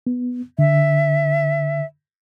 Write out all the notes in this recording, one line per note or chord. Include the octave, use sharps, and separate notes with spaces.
B3
D3 E5